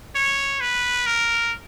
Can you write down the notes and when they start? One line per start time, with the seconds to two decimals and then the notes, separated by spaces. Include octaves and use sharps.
0.15 C#5
0.61 B4
1.07 A#4